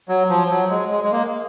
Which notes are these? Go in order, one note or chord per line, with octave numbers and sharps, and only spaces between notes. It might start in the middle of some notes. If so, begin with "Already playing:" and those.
F#3
F3
F#3
G#3
G#3
G#3
A#3